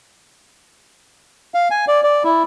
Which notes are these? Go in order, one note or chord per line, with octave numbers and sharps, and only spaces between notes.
F5
G#5
D5
D5
E4